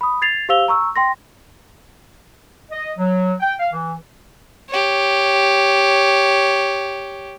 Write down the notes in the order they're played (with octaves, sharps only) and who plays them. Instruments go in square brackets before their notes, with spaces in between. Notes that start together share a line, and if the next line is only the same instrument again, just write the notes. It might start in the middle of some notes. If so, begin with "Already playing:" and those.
[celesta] B5 D#6
G#6 A6 C7 F7
G4 C5 F5 E6 F7 G7
A#5 C#6 E6
G5 C6 A#6
[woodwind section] D#5
F#3
G5
F5
E3
[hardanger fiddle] G4 C#5